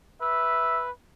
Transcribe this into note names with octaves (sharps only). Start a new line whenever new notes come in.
B4 E5